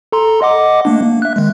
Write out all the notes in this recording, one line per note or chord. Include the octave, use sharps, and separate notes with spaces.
A4 A#5 C6
D#5 F#5 D6
A3 A#3 D4
A#3
E5 F#6
D#3 G#3